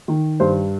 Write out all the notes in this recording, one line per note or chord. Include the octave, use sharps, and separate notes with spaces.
D#3
G2 C5